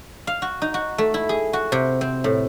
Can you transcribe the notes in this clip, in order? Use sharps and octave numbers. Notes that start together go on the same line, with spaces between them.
F5
F#4
D#4
F#4
A3
E4
G#4
F#4
C3
C4
A2